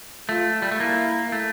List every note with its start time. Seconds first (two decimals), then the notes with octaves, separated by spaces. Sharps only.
0.29 A3 F4
0.62 G3
0.72 A3
0.80 A#3 E4
1.32 A3